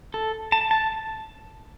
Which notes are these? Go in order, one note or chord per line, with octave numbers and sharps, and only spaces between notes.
A4
A5
A5